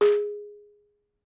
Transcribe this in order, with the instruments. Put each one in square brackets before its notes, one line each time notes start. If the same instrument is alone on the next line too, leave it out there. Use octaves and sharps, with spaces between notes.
[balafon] G#4